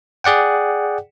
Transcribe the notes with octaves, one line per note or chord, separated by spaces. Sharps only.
G#4 D5 F#5 G5